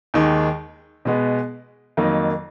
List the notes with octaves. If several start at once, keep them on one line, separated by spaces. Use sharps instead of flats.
D#2 D#3 G#3
B2 G#3 B3
F2 D#3 F#3 A#3 D#4